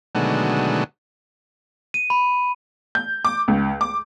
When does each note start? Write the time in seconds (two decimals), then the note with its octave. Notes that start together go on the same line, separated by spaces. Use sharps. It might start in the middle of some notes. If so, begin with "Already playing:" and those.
0.15 B2 D3 D#3 F#3 G#3 A3
1.94 D#7
2.10 B5
2.95 G6
3.25 D6
3.48 C#2
3.81 D6